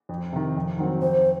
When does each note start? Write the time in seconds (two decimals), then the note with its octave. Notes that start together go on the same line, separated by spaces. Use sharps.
0.09 F2
0.33 C3 D#3
0.56 F2
0.78 D#3 F#3 C4
1.02 F2 C5